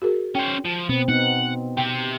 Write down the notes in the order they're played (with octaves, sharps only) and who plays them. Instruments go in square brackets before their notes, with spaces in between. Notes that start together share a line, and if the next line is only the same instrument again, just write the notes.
[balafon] F#4 G#4 A#4
[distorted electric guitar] C#4 C5 [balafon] G5
[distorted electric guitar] F3
[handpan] B2 C4 [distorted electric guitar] B3
[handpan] B3 C4 D#4 [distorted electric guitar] F#5
[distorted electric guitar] G4 C5 [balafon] G5